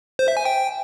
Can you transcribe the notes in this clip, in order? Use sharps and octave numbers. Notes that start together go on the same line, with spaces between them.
C5
E5
G#5
G5